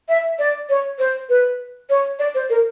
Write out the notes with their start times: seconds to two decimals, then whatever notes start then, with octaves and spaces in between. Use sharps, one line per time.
0.09 E5
0.39 D5
0.69 C#5
0.99 C5
1.29 B4
1.90 C#5
2.19 D5
2.35 C5
2.50 A#4